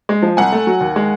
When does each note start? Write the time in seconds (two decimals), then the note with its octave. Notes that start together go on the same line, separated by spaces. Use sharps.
0.09 G#3
0.22 F3
0.37 C2 F#5 G#5
0.52 A3
0.67 F#3
0.80 D#2
0.96 G#3